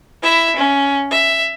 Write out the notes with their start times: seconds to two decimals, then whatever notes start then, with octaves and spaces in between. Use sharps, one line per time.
0.23 E4 E5
0.56 C#4
1.11 E5